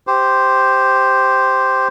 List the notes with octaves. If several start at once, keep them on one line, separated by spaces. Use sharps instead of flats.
G4 C5